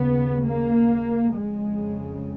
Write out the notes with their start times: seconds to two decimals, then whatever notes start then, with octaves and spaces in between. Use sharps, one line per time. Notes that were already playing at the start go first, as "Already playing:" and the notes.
Already playing: D#2 C#3 B3
0.45 A#3
1.35 F2 C#3 G#3